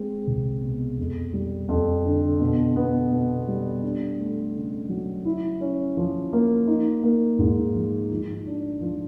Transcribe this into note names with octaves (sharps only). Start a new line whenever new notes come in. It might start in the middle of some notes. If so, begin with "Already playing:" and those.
Already playing: G#3 C4
C2
B2
F2
G3
F2
D3
B2
B3
B2
G3
D4
A3
C#3
F#3
E4
C#4
F3
A#3
D#4
A#3
G#2
F3
F3
D4
F3